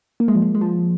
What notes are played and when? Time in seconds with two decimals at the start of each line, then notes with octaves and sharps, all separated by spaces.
0.20 A#3
0.28 G#3
0.35 F3
0.42 G#3
0.55 G#3
0.61 F3